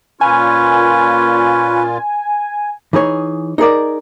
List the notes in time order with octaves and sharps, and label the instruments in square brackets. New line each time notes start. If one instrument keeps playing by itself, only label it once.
[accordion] A#2 F4 [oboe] C#4 [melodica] B4 [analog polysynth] G#5
[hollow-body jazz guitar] E3 D#4 G#4 C#5
D#4 G#4 A#4 D5